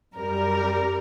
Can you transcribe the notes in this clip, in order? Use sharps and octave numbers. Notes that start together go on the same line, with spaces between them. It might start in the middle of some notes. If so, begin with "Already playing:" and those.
F#2 G3 A#4